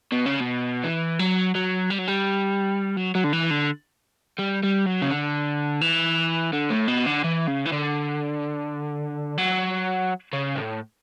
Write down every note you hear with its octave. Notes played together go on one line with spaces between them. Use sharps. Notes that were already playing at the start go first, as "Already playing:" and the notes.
B2
C#3
B2
E3
F#3
F#3
G3
F#3
G3
F#3
F#3
D3
E3
D3
G3
G3
F#3
C#3
D3
E3
D3
A2
B2
D3
E3
C#3
E3
D3
F#3
C#3
A2